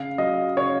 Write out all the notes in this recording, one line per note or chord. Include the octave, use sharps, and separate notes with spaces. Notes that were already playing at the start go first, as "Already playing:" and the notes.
Already playing: C#3 F5
F#3 D#5
C#3 C#5